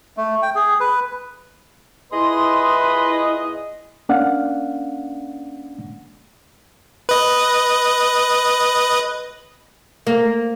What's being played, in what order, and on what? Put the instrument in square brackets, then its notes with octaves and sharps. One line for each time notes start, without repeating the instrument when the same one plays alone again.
[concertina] A3
G5
G#4
B4
[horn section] A#2 G#4 D#5 [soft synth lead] E4 [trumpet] B4 [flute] C6
[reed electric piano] A#3 C#4 D4 D5 F5 F#5
[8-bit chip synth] B4 D#5
[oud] A#3